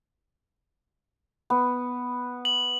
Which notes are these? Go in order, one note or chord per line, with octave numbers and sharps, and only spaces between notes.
B3
F#7